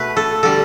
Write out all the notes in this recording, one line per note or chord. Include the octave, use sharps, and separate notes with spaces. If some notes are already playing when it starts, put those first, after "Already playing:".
Already playing: B2 A3 B4
A4
D3 G3 A4